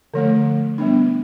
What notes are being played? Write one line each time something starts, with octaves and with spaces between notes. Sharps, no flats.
D3 F3 A3
G3 B3 D4